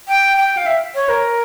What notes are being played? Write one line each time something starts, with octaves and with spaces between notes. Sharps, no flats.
G5
G5
F5
E5
C#5
A#4